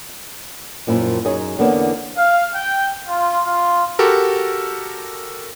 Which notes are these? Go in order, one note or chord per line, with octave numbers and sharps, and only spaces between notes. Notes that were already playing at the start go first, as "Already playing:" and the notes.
F#2 A#2 F3 E4
F#2 D#4 G#4 C#5
E2 D3 A#3 B3 C#4 D4
F5
G5
F4
F4
F#4 G4 A4 A#4